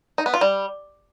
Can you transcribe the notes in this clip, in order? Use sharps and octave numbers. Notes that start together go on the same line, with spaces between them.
D#4
B3
F4
G3